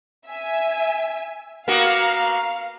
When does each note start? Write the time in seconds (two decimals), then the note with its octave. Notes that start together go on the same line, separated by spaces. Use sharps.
0.27 E5 G#5
1.68 A#3 B3 F#4 F5